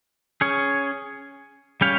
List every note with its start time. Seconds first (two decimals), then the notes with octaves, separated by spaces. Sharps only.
0.41 C#4 G#4 C#5
1.81 G3 C#4 G4 C#5 F5